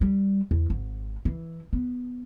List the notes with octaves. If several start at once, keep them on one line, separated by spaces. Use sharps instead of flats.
G3
E2
G#1
E3
B3